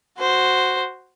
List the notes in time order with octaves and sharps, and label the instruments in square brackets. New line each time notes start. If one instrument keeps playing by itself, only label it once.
[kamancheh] F#4 C5